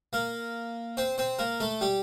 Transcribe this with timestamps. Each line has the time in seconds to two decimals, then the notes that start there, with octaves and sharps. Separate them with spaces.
0.13 A#3 A#4
0.97 C4 C5
1.18 C4 C5
1.39 A#3 A#4
1.60 A3 A4
1.81 G3 G4